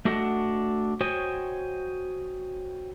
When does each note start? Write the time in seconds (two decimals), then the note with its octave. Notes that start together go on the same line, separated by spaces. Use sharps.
0.05 A3 D4 F#4 A4 D#5 F#5
1.01 F#4 C5 C#5 D#5 G5 G#5